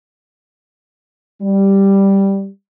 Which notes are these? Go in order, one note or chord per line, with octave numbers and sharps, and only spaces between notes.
G3